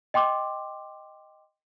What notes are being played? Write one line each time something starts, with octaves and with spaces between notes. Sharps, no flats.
D#5 G5 C6 D6